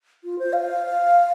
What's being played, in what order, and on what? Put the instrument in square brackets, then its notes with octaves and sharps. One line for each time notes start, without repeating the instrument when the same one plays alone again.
[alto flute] F4
C5
F5